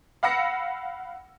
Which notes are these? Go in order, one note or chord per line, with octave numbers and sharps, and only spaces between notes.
F5 F#5 B5 E6 A#6 C#7